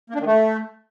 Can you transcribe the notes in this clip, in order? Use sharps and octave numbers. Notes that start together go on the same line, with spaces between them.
A#3
D4
D#3
A3